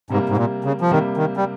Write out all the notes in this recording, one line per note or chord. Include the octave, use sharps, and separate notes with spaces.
G#2 C3 G3 A#3
G#2
A#2
C#3
F3
C3 D#3 G3 A#3
D#3
G3